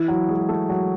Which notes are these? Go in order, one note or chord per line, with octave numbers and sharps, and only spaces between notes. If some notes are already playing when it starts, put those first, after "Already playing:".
Already playing: E3 E4
F#3 F#4
G#3 G#4
A3 A4
F#3 F#4